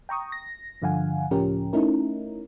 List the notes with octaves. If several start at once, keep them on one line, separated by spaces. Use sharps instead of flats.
G5 A#5 C#6 D#6
A#6
G2 D3 F3 F5 F#5 G#5
C#2 A2 F3 C#4 G4 A#4
A3 C#4 D#4 E4 A#4